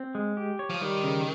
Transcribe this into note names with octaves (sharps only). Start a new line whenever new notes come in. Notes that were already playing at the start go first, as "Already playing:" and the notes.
Already playing: C4
G#3
G4
C#5
F3
D#3 G3
C#3